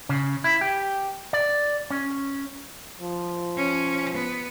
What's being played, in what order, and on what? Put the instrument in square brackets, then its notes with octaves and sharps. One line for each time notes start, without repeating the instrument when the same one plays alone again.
[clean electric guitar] C#3
E4
G4
D5
C#4
[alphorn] F3
[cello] C#4
B3